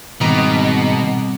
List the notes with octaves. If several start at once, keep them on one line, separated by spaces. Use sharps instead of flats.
G#2 B2 D#3 G3 C4 A#5 D6